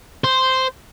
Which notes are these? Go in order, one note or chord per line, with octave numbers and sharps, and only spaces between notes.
C5